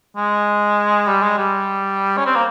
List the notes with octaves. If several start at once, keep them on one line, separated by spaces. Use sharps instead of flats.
G#3
G3
G#3
G3
C#4
C4
A#3